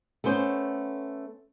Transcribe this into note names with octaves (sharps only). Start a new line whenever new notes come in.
A3 B3 C#4 C5